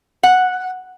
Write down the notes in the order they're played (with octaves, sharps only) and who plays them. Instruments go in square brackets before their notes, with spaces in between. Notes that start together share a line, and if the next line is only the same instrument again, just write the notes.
[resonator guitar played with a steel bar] F#5